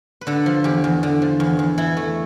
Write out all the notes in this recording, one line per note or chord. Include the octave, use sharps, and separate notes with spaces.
B4
D3 A4
F3
E2 G4
E2
D3
F3
E2
E2
E3 E4
A3